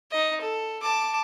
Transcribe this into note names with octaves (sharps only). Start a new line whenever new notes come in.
D#4 D#5
A4
A5 D6